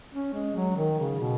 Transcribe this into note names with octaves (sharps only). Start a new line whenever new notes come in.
C#4
G#3
F#3
D#3
C#3
B2